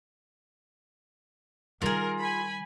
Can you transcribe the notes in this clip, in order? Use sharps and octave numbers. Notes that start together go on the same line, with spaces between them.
D#3 G3 F4 G#4 A#4
G#5 B5